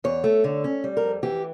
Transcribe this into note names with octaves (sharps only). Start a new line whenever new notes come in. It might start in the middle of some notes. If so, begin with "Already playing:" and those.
E2 C#5
A3
D3
C#4
G3
A#4
F2
E3 G4